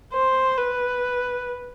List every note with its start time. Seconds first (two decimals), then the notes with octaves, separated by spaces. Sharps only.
0.13 C5
0.57 B4